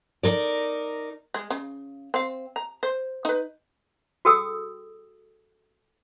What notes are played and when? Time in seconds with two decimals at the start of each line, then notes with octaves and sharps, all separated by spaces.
0.23 D#4 A#4 D5
1.34 G#3
1.50 C#3
2.14 C4 F5
2.56 A#5
2.83 C5
3.25 D#4 B4
4.25 F#4 G#4 A4 G5 D#6 E6